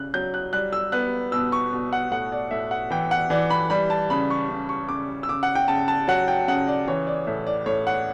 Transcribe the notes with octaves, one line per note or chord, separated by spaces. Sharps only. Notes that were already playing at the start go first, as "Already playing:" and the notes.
Already playing: C#3 F#6
F#3 G6
F#6
G3 F#6
E6
B3 F#6
B2 E6
C#6
B2
F#5
A2 F#5
D5
A2 E5
F#5
E3 G5
F#5
E3 D5
B5
G3 B5
A5
C#3 B5
C#6
C#3
C#6
C#3 D6
E6
C#3 D6
F#5
G5
C#3 A5
A5
F#3 F#5
G5
C#3 F#5
D5
E3 C#5
D5
A2 E5
D5
A2 C#5
F#5